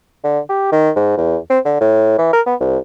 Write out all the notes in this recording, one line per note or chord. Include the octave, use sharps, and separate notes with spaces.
D3
G4
D#3
G#2
E2
C4
D3
A2
E3
A#4
B3
C2